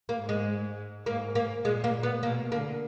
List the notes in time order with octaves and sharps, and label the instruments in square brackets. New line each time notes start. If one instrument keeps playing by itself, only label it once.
[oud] A#3
[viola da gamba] G#2
[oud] G#3
[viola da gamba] G#2 [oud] A#3
[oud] A#3
[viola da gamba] A#2 [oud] G#3
[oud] A#3
B3
[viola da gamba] B2 [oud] A#3
[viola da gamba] D3 [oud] A#3